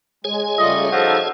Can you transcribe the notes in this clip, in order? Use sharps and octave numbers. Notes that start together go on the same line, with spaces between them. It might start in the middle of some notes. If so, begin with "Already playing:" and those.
G#3 G#4 C#5 G#5
C#3 G3 A3 F4 D#5
F3 D#4 F#4 A4